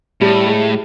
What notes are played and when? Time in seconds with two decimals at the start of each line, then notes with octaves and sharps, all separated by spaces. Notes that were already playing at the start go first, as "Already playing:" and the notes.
0.21 A2 G3
0.46 G#3